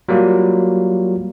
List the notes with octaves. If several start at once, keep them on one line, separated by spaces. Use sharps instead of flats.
F#3 G3 A#3 F4 F#4